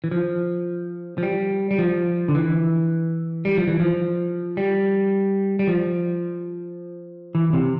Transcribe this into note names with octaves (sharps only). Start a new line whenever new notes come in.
E3
F3
F3
G3
G3
F3
D3
E3
G3
F3
E3
F3
G3
G3
F3
E3
C3